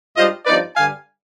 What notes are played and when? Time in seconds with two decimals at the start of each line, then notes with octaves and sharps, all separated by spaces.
0.17 G#2 G3 D4 F4 C5 D#5
0.46 G2 F3 B3 D#4 B4 D5
0.76 G2 D3 G3 F5 G#5